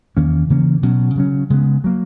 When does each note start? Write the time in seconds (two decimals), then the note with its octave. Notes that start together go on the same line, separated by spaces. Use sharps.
0.16 E2 D#3 A#3 C#4
0.50 C#3 E3 A#3 C#4
0.83 B2 F#3 C#4
1.15 C#3 F#3 C#4
1.50 C#3 G#3 B3
1.84 F#3 A#3